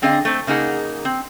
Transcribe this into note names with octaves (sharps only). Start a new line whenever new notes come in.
D3 C4 D4 G#4 D#5 F5
A3 C4
C#3 A#3 D#4 G#4 F#5
C4